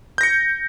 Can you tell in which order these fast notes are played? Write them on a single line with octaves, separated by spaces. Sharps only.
G6 A#6 C#7